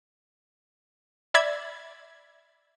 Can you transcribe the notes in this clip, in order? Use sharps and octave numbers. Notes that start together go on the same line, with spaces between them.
D5 E5 B5 G#6